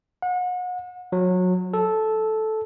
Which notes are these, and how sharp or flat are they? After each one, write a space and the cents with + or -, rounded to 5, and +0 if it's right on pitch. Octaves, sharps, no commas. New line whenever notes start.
F#5 -35
F#3 -25
A4 -10